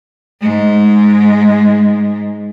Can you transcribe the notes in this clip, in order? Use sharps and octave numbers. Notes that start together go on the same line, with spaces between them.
G#2 G#3